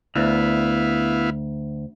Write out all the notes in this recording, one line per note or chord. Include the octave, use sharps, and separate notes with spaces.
D2 B3 E4 F5